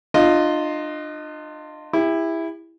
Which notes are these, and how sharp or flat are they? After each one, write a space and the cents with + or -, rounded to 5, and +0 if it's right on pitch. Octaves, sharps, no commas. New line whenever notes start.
D4 +35 F4 +0 D#5 +0
E4 +0 G4 +40